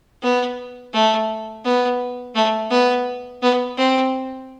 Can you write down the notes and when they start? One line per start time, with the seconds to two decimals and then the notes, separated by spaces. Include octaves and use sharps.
0.22 B3
0.93 A3
1.65 B3
2.35 A3
2.70 B3
3.42 B3
3.77 C4